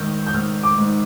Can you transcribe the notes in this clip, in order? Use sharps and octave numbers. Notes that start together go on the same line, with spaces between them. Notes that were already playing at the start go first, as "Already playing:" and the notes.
Already playing: G#2 D#3 F6 G6
G6
G#2 F6
D6
G#2